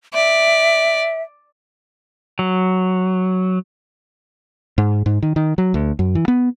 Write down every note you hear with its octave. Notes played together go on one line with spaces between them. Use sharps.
D5 E5
F#3
G#2
G#2
D#3
D#3
F#3
D2
F#2
E3
B3